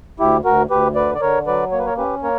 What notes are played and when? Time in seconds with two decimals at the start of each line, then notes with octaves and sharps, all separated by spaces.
0.19 D2 E4 G4
0.44 D2 F#4 A#4
0.70 D2 G4 B4
0.95 D3 B4 D5
1.15 D5
1.21 D3 A#4 C#5
1.47 F#3 B4 D5
1.72 A#3 C#5
1.79 B4
1.86 A#4 C#5
1.97 C#4 G4 B4
2.23 A#3 A#4 C#5